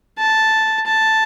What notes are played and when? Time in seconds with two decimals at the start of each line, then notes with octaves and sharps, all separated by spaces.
0.19 A5
0.86 A5